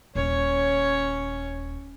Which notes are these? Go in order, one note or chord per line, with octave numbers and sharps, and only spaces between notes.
D#1 C#4 C#5